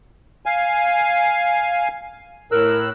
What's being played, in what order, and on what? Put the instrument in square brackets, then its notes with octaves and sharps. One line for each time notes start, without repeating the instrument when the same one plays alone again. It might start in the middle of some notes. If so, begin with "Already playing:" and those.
[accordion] F5 G#5
[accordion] A2 E6 F#6 [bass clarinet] A#4